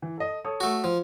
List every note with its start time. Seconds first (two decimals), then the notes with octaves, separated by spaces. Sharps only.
0.02 E3
0.18 A4 D#5
0.45 A4 C#5 D#6
0.60 A3 F#4
0.84 F3